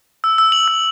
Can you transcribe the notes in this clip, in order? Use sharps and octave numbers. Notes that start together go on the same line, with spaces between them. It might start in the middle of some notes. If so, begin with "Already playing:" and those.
E6
E6
F#7
E6